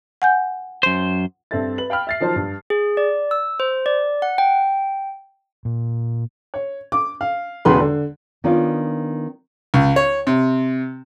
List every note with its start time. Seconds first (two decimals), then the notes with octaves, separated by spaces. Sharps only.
0.22 F#5 G#5 G6
0.83 F#2 C5
1.51 G2 C4 A4 E5 A6
1.78 B4 F#7
1.90 F5 G5 B5 F6
2.07 E5 A6 C7
2.20 D#3 F3 F#3 C5 A5
2.36 G2
2.70 G#4
2.97 D5
3.31 E6
3.60 C5
3.86 D5
4.22 F#5
4.38 G5
5.65 A#2
6.54 C#5
6.92 D6
7.21 F5
7.65 E1 E2 C#3 B4 C6
7.80 D3
8.44 D#3 B3 C#4 D4 F4
9.74 C#2
9.96 C#5
10.27 C3